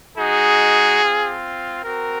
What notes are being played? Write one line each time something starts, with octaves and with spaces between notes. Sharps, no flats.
G#3 D#4 F#4 G#4
C4 F4
C4 F#4 A#4